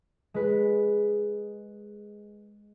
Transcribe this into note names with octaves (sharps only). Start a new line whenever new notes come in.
G#3 B4